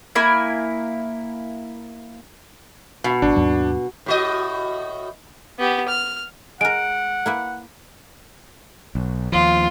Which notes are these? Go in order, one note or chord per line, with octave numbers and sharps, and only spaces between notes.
A#3 E4 G#5
B2
G#1 D4
D#2 G#2 F#3
A2 F#4 D#5
B3 G4
F6
G#3 A#4 F#5 D7
A#3 E4 B4
B1
D#2 F3 F4